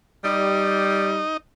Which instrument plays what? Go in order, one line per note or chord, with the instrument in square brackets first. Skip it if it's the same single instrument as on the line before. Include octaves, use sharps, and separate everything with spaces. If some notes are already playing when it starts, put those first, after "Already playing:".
[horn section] G3 [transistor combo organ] D#4 D#5